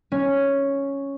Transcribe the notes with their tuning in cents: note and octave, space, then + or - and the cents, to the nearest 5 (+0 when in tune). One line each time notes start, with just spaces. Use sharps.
C#4 +0